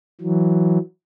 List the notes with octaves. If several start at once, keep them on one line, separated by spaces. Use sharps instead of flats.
E3 F#3